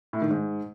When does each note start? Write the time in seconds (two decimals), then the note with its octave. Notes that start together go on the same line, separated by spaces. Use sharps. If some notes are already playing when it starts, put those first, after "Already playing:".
0.13 A2
0.22 D#3
0.30 G#2